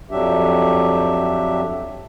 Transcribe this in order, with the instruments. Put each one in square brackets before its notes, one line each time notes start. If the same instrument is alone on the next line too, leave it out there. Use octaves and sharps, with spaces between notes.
[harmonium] F2 F#3 D4 G4 E5